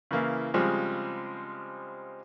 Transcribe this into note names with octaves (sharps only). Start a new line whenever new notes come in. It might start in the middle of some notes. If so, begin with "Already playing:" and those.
C#3 E3 A#3 E4
C#3 F3 G3 G#3 C4